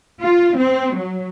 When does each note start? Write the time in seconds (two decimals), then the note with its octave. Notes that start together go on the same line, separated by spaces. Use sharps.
0.21 F4
0.57 C4
0.95 F#3